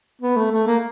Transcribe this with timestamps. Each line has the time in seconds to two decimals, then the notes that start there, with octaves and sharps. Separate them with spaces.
0.21 B3
0.37 A3
0.52 A3
0.67 A#3